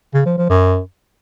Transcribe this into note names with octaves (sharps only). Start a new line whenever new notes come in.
C#3
F3
F3
F#2